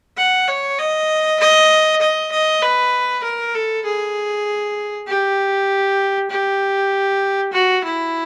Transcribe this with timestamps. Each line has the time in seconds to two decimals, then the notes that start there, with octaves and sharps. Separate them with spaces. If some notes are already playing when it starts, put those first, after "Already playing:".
0.17 F#5
0.48 C#5
0.79 D#5
1.40 D#5
2.01 D#5
2.31 D#5
2.62 B4
3.24 A#4
3.54 A4
3.85 G#4
5.08 G4
6.30 G4
7.53 F#4
7.84 E4